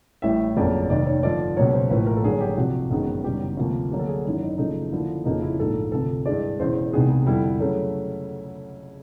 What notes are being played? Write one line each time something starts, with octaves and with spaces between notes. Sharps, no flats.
A1 A2 E3 G3 E5
G1 F2 C#3 F#3 A#3 D5
F1 D#2 D#3 D5
C#5
G2 D3 F3 D5
C#2 B2 F#3 A#3 C#5
C5
A1 A2 F3 A#3 B4
A#4
A4
G#1 G2 D3 F#3 A#3 G#4
G4
C2 C3 F3 F#4
G1 F#2 D#3 G#3 B3
F#1 F#2 D#3 G3 B3 G4
D2 C3 F3 A#3
D2 D3 F#3 A#3 G4
A4
G#4
G#1 F#2 D#3 F#3 E4
D#4
F#1 F#2 C#3 F3 A3 D#4
D#2 D3 F3 A#3 E4
F#1 F2 C#3 F3 A#3 D#4
E4
A#1 G#2 F3 A3 A4
D2 C3 F3 A4
G2 E3 G#3 D5
E1 E2 C#3 E3 C5
C2 C3 D#3 G#3 B3 G#4
F2 D3 G3 E4
C#3 F#3 A3